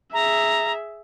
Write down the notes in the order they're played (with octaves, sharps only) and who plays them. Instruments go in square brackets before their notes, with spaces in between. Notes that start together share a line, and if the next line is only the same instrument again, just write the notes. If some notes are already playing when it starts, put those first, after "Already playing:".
[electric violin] G#4 E5 [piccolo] A#5